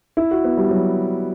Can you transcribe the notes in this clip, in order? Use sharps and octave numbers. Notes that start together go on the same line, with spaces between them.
E4
F#4
B3
G3
F#3